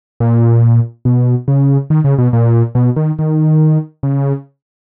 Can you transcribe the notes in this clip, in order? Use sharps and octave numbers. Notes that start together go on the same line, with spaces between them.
A#2
B2
C#3
D#3
C#3
B2
A#2
B2
D#3
D#3
C#3